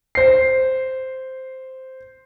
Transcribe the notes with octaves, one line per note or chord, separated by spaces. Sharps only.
C5 C7